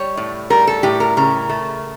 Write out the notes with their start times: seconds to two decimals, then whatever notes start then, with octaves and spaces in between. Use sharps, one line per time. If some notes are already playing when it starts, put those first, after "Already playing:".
Already playing: G3 C#5
0.17 A2
0.50 G3 A#4
0.67 A4
0.83 A2 G4
1.00 A#4
1.17 C#3 A#4
1.49 A3